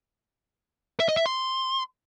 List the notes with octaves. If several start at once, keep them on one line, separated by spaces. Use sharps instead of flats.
E5
D#5
E5
C6